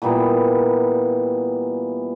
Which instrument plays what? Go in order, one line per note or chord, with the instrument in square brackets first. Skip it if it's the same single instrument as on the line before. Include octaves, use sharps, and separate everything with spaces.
[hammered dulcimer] A#2 E3 G3 B3